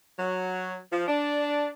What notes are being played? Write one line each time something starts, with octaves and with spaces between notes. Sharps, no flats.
F#3
F3
D4